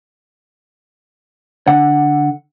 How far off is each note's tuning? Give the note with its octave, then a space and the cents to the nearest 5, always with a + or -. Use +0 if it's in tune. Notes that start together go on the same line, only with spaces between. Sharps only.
D3 +0 F#5 +0